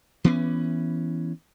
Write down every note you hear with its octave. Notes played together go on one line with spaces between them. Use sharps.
E3 B3 C#4